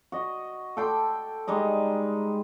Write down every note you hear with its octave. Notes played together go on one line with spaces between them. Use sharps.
F#4 D#5
A4 G5 C6 D6
G3 G#3 D#4 D#5